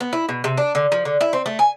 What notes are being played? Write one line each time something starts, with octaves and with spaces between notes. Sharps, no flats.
B3
E4
B2
C3
D4
D3
F3
D3
E4
C4
A3
G#5